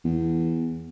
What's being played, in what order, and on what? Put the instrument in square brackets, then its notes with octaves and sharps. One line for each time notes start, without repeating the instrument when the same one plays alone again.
[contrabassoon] E2